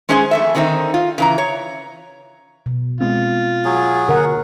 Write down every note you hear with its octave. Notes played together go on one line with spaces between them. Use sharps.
G#3 C#4 G#4 C5 F5 G#5
F2 A3 E5
D3 D#3 A3 C4 D#4
F4
C#3 E3 A#5
C#5
B2
G#3 B3 C4 F4
F#3 G#4
D3 A#4 F#5